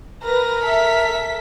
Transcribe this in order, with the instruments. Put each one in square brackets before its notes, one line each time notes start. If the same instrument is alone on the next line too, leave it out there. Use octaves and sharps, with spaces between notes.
[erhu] A#4 [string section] B4 A#6
[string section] A4 E5 B6